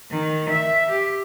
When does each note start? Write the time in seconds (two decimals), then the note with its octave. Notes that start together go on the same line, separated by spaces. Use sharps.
0.11 D#3
0.50 E5
0.91 G4